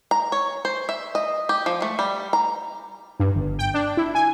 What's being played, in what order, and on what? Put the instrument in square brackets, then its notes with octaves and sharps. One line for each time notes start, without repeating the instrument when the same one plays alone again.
[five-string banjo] A#5
C#5
C5
E5
D#5
G4
F3
A3
G3
A#5
[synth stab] G2
G1
G5
D4
E4
G#5